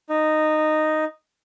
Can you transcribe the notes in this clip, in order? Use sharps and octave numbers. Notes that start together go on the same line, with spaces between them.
D#4